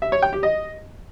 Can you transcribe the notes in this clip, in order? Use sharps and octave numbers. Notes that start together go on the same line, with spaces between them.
E5
C#5
G5
G4
D#5